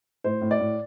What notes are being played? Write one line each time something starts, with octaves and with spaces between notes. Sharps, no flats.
A2 C5
A2
D5
A2